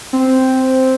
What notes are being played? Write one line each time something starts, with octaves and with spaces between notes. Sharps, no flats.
C4